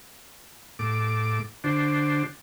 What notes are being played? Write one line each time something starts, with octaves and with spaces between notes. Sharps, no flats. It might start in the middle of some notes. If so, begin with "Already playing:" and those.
A2 D6
D3 D4 F#4 C5